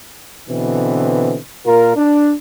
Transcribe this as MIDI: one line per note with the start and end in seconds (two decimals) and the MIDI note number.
0.48 1.37 47
0.48 1.37 50
0.48 1.37 52
0.48 1.37 60
1.65 1.94 46
1.65 1.94 65
1.65 1.94 70
1.96 2.32 62